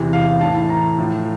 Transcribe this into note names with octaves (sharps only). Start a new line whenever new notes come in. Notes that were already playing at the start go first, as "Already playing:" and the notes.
Already playing: E2 C3 E3
F5
A2 E3 A5
A#5
A2 F3